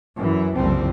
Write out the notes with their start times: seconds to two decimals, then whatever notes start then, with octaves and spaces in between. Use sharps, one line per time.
0.17 F#2 E3
0.56 F#1 C2 F3 G3 C4